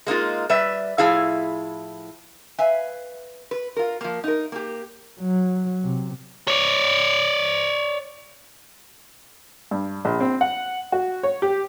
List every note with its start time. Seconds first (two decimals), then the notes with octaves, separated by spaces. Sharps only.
0.07 G#3 A#3 D#4 F4
0.49 G3 B4 D5 E5
0.98 A2 F3 E4 G#4 F5
2.58 B4 E5 F5 G#5
3.51 B4
3.76 F4 A#4
4.01 F3 A#3
4.24 D#4 A#4
4.52 A#3 G4
5.20 F#3
5.84 C3
6.48 C#5 D5
9.71 G2
10.05 A#1
10.20 C4
10.41 F#5
10.92 F#4
11.23 C#5
11.42 G4